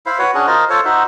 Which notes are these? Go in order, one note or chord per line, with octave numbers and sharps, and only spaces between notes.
E4 C5 F5 B5
F#4 B4 C#5
C#4 D4 F#4 G#4
F4 A#4 C5 D#5
F4 A4 C5 C#5
D#4 F#4 C5 E5